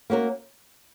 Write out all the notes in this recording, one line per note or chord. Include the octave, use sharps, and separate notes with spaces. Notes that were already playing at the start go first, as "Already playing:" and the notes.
A#3 C#4 F#4 A#4